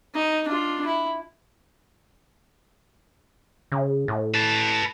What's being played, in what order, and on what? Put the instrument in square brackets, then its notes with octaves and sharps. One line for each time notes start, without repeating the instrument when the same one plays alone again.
[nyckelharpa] D#4
D4 F4
E4
[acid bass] C#3
A2
[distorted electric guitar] B4 A5